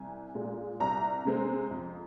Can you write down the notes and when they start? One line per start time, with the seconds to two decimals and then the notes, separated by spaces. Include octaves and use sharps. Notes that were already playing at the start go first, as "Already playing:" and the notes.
Already playing: C2 G#5
0.35 A#2 G#3
0.80 C2 A#5
1.25 C3 G#3 C4
1.71 F2